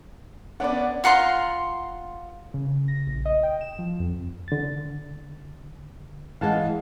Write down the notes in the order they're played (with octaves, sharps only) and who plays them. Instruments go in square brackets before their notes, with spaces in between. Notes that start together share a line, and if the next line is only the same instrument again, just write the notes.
[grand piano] B3 C#4 D4 [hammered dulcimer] D5 F#5
[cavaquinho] F4 F#5 A#5 C6
[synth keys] C#3
A#6
A#1
D#5
G5
E7
F3
F2
[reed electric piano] D3 A6
[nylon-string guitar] E3 G#3 [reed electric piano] F5 F#5 A5